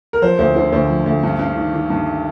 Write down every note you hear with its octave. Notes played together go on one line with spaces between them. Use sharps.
A#4
F3 C5
D2 C5
D3 C5
D2 C5
F3
D2
G2
G2
D#3
D#3
G2